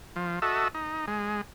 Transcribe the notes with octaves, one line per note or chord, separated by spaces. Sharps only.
F3
F#4 A4 D#5 E5
D#4
G#3